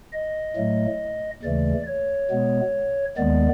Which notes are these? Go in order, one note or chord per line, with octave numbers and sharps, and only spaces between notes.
D#5
A2 F#3 A3
D#2 C#3 E3 A3 D5
C#5
B2 G#3 B3
D#2 D#3 G#3 B3 D5